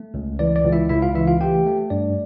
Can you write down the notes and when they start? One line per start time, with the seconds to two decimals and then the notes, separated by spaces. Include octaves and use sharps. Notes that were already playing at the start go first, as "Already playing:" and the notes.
Already playing: A3
0.14 C#2
0.39 E3 D5
0.56 D5
0.65 C#2
0.73 E4 E5
0.89 C#2 E4 E5
1.02 F4 F5
1.15 E3 E4 E5
1.27 F4 F5
1.41 A3 G4 G5
1.66 A3
1.90 G2 D5